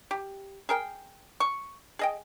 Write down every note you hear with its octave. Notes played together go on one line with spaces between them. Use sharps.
G4
G#4 A#4 G5
C#6
G#4 D#5 G5